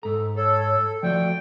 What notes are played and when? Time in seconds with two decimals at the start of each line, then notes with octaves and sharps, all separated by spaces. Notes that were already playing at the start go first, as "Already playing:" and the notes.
0.03 G#2 A4 A#5
0.36 A4 C#5
1.03 F3 A3 F#4 D5 G5